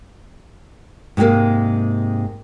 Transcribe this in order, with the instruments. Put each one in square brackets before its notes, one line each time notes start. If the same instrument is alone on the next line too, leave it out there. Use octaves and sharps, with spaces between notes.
[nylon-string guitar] G#2 C3 G3 G#3 A#3